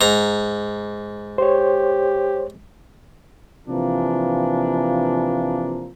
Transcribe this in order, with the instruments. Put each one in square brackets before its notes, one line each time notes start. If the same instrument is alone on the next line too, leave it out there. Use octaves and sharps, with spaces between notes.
[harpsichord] G#2 A#5
[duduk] G4 [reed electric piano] C5 C#5
[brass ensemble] C3 E3 F3 A#3 D4